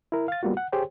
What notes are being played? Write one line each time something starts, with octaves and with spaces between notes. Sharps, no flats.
E4 A#4
F5 A6
G3 A#3 B3 F4 F#4
F#5
G4 G#4 C5 C#5 G5